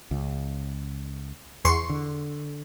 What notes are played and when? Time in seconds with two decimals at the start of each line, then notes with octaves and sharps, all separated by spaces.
0.11 C#2
1.65 E2 C6 C#6
1.90 D3